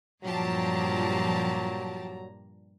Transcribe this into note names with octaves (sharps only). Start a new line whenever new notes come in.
G2 A#2 F3 F#3 G4 A5 A#5